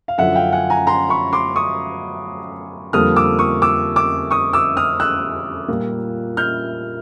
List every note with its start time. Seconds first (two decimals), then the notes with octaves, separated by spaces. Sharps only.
0.08 F5
0.18 F#2 D3 F3 E5 F#5
0.35 F5 G5
0.52 F#5 G#5
0.70 G#5 A#5
0.87 A#5 C6
1.09 B5 C#6
1.33 C6 D6
1.56 C#6 D#6
2.93 F2 D3 G3 A#3 D#6 F6
3.16 D6 E6
3.39 C#6 D#6
3.62 D6 E6
3.96 D6 E6
4.31 C#6 D#6
4.53 D6 E6
4.77 D#6 F6
5.00 E6 F#6
5.68 A#2 G3 A#3
6.37 F6 G6